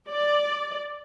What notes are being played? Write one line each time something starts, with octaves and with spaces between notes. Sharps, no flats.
D5